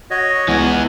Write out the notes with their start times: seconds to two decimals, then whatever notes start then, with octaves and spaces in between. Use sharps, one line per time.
0.11 F#4 C#5 D#5
0.48 C#2 E3 B3 G#5